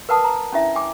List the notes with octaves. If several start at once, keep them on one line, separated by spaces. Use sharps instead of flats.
A#4 B4 F#5 A5 D#6
A#5
C#4 D4 E4 E5
G5 G#5 D6